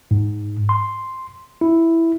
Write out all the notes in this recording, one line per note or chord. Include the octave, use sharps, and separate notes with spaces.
G#2
C6
E4